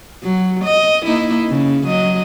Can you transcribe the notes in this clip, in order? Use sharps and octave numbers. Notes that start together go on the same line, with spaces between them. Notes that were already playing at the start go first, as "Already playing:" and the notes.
F#3
D#5
A#3 D#4 E4
C#3
F#3 D#5